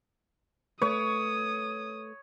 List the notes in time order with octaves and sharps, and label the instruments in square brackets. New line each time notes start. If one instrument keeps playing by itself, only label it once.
[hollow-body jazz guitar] A3 B4 [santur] C#5 [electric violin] D#6